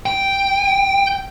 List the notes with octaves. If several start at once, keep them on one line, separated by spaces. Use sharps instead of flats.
G5